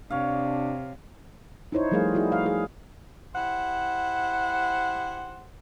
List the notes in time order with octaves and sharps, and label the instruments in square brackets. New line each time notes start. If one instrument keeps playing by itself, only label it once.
[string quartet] C3 [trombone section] D4 [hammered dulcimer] C#5 F5
[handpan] D#4 E4 C5 C#5
F3 G3 A3 G#4 A#4 F5
D#4 E4 F#4 G#4
F5
G#4
[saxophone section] E4 G4 C5 F#5